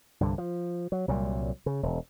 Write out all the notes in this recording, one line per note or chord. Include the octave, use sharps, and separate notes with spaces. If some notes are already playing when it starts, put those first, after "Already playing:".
C2 G2 D3
F3
F#3
C2 A#2 F#3 G3
C#3
E1